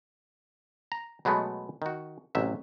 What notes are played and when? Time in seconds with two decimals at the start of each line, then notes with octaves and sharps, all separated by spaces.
0.92 A#5
1.25 B2 F#3 G#3 A3 B3
1.82 D#3 F#4
2.35 A1 C3 F#3 E5